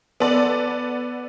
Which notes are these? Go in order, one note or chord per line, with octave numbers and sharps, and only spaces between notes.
B3 A4 D5